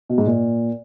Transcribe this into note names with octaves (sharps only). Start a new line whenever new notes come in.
B2
G#2
A#2